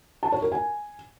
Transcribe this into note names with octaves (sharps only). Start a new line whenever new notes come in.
A5
C#5
A#4
G#5